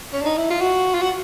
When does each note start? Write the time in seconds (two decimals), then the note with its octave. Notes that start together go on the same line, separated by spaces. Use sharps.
0.13 C#4
0.22 D4
0.25 D#4
0.38 E4
0.50 F4
0.61 F#4
0.94 F4
1.02 F#4